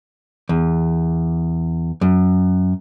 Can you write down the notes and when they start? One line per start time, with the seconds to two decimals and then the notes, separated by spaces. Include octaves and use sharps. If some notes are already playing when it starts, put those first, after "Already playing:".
0.49 E2
2.01 F#2